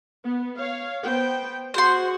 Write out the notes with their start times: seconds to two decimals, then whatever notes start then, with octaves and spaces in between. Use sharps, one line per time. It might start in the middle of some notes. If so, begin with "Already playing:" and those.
0.24 B3
0.57 C#5 F5
1.04 B3 C5 G5
1.74 F#4 G#4 C5 F#5 C6